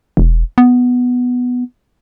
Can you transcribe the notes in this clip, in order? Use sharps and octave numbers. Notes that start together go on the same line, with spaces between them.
E1
B3